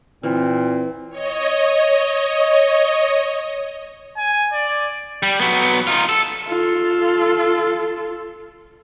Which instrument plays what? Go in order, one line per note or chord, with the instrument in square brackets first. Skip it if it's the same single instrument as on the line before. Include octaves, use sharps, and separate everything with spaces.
[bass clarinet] A#2 [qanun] E3 [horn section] C4
[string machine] C#5 D#5
[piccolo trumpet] G#5
D5
[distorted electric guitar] G3
F#3 B3
D#4 F4
A4
[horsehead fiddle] F4 A4